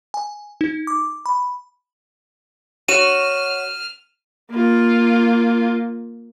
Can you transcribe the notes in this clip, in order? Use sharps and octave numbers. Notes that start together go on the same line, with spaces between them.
G#5
D#4
D6
B5
F#4 C#5 F6 D#7 E7
A#3 F4